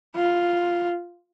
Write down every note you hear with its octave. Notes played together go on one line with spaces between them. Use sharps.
F4